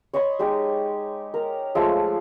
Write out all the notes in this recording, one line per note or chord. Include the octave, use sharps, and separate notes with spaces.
C#5 D#5 B5 C6
G#3 D#4 G4
A#4
F3 G#3 A3 F4